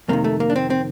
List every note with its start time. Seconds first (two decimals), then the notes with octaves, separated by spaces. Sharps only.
0.08 F2 C3 D#3 A#3
0.24 A3
0.40 A#3
0.50 D4
0.56 C4
0.70 C4